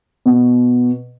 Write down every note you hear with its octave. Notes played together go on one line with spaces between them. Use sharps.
B2